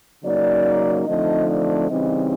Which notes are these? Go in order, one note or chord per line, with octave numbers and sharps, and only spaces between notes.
C#3 F#3 A#3 D#4 D5
D3 F3 A3 C4 D#4 D#5
D5
C#3 E3 G3 C4 D#4 D#5